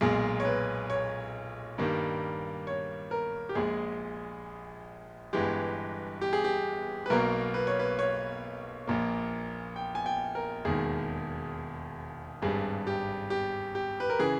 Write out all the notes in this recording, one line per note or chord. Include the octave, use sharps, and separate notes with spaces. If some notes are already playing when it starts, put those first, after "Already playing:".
B1 A#2 G#3 G#4
C#5
B4
C#5
G2 D#3 G3 A#3
C#5
A#4
G4
A#1 A#2 G#3 G#4
G1 G2 E3 G#3 G4
G4
G#4
G4
B4
B1 B2 A#3 A#4
B4
C#5
B4
C#5
A#1 A#2 A#3
G5
G#5
G5
A#4
E1 D#2 D#3 G#4
G#1 G2 G3 G#4
G4
G4
G4
B4
A#4
C#3 E3 G#4